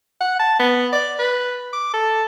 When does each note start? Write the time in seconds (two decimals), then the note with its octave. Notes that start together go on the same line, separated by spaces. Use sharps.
0.21 F#5
0.40 A5
0.59 B3
0.92 D5
1.19 B4
1.73 D6
1.93 A4